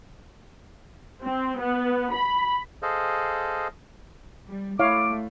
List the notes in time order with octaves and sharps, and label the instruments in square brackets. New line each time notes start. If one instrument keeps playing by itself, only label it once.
[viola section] C4
B3
B5
[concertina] G#4 A4 C5 D#5 F5
[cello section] G3
[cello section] A3 [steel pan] E4 C#5 F5 [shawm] D6